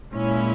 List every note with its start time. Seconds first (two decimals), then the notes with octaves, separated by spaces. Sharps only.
0.13 A#2 G#3 C#4 E4